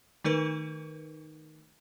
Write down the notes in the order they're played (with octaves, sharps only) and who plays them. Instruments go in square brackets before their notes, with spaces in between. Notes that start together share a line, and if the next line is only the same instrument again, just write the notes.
[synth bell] D#3 A3 D#4 A#4 B4